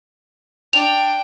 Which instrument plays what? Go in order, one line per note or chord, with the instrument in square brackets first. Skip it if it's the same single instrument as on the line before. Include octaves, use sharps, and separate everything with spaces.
[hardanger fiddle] D4 G5 [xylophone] F7